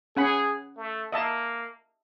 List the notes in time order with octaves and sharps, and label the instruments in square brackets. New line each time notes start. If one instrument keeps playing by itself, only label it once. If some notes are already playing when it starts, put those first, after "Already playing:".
[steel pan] C#4 F#5 B5 [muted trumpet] G#4
[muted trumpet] A3
[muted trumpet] A#3 [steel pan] D#5 E5 A5